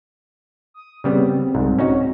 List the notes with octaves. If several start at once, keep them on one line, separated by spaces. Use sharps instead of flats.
D#6
C#3 G3 B3 C4
C2 G#2
C#4 D#4 F#4